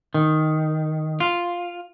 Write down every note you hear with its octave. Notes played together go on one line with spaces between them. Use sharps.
D#3
F4